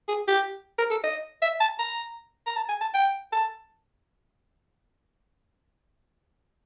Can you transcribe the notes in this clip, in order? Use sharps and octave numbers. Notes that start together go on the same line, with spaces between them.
G#4
G4
A#4
A4
D#5
E5
A5
A#5
A#5
A5
G#5
A5
G5
A5